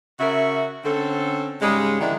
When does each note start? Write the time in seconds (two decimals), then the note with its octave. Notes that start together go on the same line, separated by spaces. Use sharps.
0.20 C#3 F#4 A#4 E5
0.85 D3 C4 C#4 A4
1.62 G#2 C#3 G3 G#3
2.01 D3 D#3 F3 G#3 D4 E4